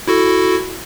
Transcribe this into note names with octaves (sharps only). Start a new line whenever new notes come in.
E4 F#4 A4